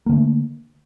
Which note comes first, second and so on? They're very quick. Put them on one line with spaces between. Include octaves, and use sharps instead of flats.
A#3 D3 A3